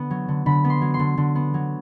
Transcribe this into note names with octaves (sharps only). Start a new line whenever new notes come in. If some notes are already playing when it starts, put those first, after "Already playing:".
Already playing: D3 B3
F#3
D3
D3 B5
B3
C6
F#3
C6
D3
D3
B3
F#3